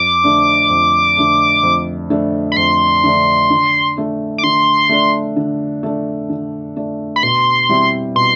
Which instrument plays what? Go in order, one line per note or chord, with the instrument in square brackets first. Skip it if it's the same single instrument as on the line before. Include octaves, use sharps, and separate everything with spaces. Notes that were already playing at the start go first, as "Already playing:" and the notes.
Already playing: [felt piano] F2 [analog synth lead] D6
[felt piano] D3 A3 D4
F2
D3 A3 D4
F2
D3 A3 D4
[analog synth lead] B5
[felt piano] F2 [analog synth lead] C6
[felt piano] D3 A3 D4
D3
A3 D4
[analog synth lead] D6
[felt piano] D3 [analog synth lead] C6
[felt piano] A3 D4
D3
A3 D4
D3
A3 D4
[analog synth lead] B5
[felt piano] B2 [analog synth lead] C6
[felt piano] G3 C4 E4
[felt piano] B2 [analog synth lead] C6